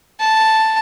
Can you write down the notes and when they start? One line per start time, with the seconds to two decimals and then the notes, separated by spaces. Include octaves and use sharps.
0.20 A5